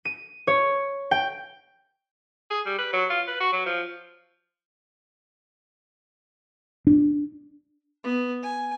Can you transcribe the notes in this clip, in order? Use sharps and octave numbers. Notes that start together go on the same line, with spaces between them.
D#7
C#5
G5
G#4
G3
B4
F#3
F4
B4
F#4
F#3
F3
D4
B3
G#5